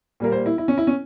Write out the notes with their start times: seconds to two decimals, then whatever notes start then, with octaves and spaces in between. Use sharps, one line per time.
0.20 A#2 G3 A#3 A#4
0.32 C5
0.46 E4
0.58 E4
0.68 C#4
0.78 E4
0.87 C#4